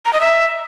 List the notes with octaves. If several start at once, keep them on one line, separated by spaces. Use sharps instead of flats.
A#5
D#5
E5